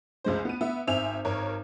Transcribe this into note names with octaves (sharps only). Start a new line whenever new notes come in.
C#2 G#3 C5
B3 D#7
B3 E5
G#1 C4 E5 G#5 F7
G#1 A#4 C#5